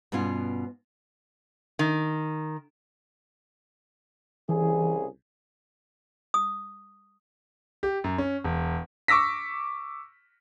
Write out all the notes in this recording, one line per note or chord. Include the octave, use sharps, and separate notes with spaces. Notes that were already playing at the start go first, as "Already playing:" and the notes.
G2 B2 B3 C#4 F4
D#3
C2 C#3 E3 G#4
D#6
G4
F#2
C#4
E1
C#6 D6 E6 A#6 B6